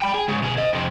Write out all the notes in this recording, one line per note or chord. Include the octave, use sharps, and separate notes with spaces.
G5 B5
G#4
G#2 C#3
B2 G#4
C5 D#5
F2 C3